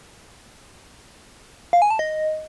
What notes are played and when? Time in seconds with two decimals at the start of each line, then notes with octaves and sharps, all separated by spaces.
1.73 F5
1.82 G#5
1.90 A5
1.99 D#5